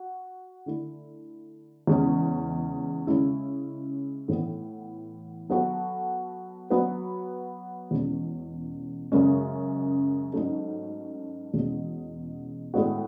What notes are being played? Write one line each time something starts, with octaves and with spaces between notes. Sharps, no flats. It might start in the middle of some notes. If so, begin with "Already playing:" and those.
Already playing: F#4
D3 A3 E4
E2 C#3 G#3 C#4
C#3 G#3 C#4 E4
A2 E3 B3
F#3 B3 F#4 A4
F#3 B3 F#4 B4
E2 B2 G#3 C#4
F#2 C#3 G#3 C#4
G#2 F#3 A3 C#4
E2 B2 G#3 C#4
A2 G#3 B3 F#4